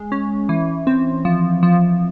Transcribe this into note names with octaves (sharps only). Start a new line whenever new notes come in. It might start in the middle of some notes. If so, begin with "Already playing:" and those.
Already playing: G#3
C#4
E3
C4
F3
F3